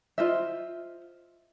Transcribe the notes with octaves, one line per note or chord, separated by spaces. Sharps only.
F4 C5 D#5 E5